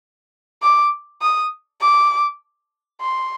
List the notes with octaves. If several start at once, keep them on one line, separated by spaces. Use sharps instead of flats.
D6
D#6
D6
C6